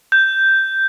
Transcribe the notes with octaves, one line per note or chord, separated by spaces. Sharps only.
G6